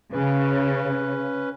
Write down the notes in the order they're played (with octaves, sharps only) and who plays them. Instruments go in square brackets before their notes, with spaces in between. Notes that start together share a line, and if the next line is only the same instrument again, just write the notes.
[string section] C#3 [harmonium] C#4 B4